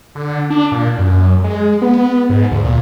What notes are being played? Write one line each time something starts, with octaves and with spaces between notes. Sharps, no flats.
D3
D4
A#2
F#2
G#3
B3
G#2
D2
A#2